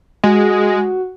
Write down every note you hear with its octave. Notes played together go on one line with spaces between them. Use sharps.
G#3 F#4